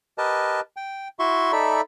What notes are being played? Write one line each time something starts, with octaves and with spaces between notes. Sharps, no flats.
G4 A#4 B4 D#5 A5
G5
E4 F#4 E5 C6 C#6
D#4 A4 D5 E5 B5